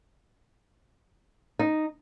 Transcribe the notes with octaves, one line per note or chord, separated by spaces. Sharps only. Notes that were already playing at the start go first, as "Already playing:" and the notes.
D#4